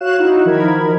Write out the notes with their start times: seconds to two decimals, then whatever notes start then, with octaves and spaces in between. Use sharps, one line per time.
0.01 F#4 C#5 F5 F#6 E7
0.18 D#4 E4 F#4
0.45 D#3 F3 D#4 A#4 B5 G#6